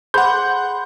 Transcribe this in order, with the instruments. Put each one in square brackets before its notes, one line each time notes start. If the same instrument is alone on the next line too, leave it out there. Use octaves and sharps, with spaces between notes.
[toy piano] G#4 C5 B5 [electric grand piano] F#5 G6 [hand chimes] C6